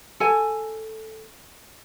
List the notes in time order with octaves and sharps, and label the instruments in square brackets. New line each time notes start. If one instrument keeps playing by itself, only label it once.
[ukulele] A4 G#5